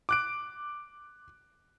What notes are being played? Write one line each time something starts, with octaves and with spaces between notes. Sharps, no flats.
D6 F#6 D7